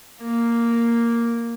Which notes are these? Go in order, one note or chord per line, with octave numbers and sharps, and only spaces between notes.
A#3